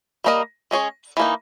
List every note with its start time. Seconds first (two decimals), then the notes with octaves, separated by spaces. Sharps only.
0.24 G3 A#3 D#4 A#4 D#5
0.71 G#3 C#4 G#4 C#5
1.17 E3 A#3 D#4